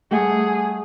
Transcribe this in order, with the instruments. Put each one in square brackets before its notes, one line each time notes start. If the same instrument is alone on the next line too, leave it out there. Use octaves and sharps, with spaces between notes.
[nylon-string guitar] G3 A3 F#5 [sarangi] G#4